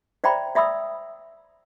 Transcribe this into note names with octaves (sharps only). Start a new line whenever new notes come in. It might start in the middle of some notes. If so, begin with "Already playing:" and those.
C5 D5 E5 G5 A#5 B5
D5 E5 B5 D#6 E6